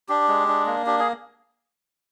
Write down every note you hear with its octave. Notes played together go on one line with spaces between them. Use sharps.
D4 G4
G#3
D4
A#3
D4 G4
G#4